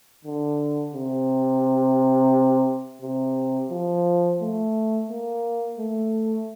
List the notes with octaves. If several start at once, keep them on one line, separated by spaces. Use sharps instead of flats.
D3
C3
C3
F3
A3
A#3
A3